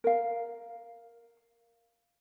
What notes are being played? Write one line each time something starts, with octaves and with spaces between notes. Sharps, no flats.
A#4 F5